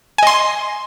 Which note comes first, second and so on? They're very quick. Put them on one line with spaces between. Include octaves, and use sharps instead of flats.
G#5 D#5 C6